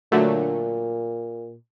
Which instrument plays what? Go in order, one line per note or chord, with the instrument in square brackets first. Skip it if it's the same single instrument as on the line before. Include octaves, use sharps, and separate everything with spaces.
[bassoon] A#2 [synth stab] D3 F#3 A3